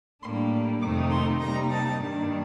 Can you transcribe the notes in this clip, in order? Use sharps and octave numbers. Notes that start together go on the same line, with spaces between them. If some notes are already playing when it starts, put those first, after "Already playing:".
A2 G3 A#3 D4 C6
F2 C3 D#3 A3 D#4 D6
C6
C3 G3 A#3 D#4 A#5
A5
G2 D#3 A#3 D4